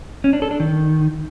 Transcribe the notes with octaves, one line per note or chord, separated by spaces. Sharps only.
C#4
D4
A4
D4
D#3